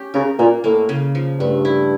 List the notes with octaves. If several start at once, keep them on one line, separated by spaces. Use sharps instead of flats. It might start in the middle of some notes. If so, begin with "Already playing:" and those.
Already playing: C#4 G4
C#3 A#4
A#2 A#3
A2 A#3
C#3
F3
G2 A3
E4